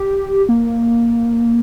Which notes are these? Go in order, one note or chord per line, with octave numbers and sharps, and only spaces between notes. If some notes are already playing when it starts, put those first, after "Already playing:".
Already playing: G4
A#3